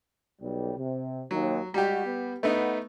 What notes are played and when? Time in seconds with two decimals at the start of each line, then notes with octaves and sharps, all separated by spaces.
0.42 B1 G3
0.77 C3
1.31 D#2 F#3
1.74 G3 G#3 F#4 G4
2.05 B3
2.43 A3 B3 D#4 B4 F#5